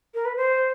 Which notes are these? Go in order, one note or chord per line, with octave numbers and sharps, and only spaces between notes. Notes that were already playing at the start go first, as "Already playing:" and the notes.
A#4
B4
C5